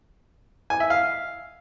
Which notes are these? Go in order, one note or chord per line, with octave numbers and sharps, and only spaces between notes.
G#5
E5
F5